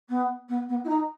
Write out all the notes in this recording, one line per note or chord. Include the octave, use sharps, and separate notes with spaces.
B3
B3
B3
E4
D#4